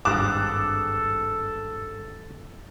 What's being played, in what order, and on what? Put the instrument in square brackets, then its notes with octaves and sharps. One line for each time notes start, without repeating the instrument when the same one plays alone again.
[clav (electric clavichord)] G#1 G2 A#5 [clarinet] A4 [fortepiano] D6 [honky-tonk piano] D#6 F#6 E7